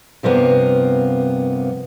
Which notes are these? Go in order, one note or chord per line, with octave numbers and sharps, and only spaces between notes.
G2 C3 F3 A#3 B3